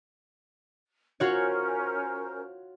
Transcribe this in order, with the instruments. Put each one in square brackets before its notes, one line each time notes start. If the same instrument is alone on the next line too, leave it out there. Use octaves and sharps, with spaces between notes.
[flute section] C#4 A#4 C5 [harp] F4 F#4 C#5